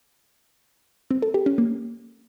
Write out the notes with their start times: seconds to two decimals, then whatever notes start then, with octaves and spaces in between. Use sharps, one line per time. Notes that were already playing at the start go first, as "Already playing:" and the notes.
1.11 C4
1.22 A4
1.34 G4
1.46 C#4
1.58 A#3